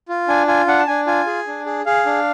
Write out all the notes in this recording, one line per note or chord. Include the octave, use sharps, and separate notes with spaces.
F4
D4 G#5
F4 G#5
D4 F#5
A5
D4 G#5
F4 G#5
G#4
D4
G#4
G#4 F5
D4